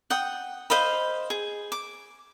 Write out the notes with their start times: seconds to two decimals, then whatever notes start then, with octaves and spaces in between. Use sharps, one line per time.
0.10 F#5 G5 D#6
0.70 C5 D#5 F5 B5
1.30 G#4
1.72 D6